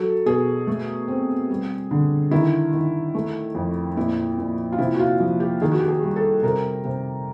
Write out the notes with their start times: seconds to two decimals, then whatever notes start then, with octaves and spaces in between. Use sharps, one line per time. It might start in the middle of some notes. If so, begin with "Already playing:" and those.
Already playing: F#3 A4
0.26 B2 G#4
0.67 A3
1.08 C4
1.50 G3
1.91 D3
2.31 D#3 E4
2.73 D#3
3.14 A3
3.55 F2
3.96 A#2 E4
4.38 A#2
4.72 F4
4.78 C3 E4
4.95 F#4
4.99 F4
5.20 F3
5.40 G4
5.61 D#3 G#4
5.71 F#4
5.80 G4
5.88 G#4
6.03 G3
6.16 A4
6.43 C3 A#4
6.84 C3